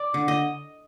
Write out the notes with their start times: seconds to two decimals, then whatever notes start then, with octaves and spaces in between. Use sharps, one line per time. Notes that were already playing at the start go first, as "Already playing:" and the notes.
Already playing: D5
0.14 D3
0.28 D#5